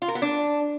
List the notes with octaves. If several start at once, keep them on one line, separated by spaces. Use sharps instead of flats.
F4
A#4
B3
D4